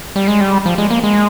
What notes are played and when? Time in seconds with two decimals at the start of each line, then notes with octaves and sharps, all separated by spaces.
0.16 G3
0.28 G#3
0.40 G3
0.66 F3
0.78 G#3
0.91 A#3
1.04 G#3